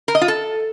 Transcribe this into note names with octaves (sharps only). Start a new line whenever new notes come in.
A#4
D#5
F4
A4